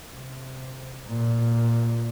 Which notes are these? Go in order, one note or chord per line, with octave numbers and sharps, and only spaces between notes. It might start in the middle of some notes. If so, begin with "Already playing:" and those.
C3
A#2